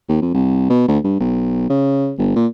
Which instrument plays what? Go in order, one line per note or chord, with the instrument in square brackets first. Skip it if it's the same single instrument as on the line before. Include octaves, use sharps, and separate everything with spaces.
[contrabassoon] D#2
F2
C2
B2
D2
G2
B1
C#3
G1
A#2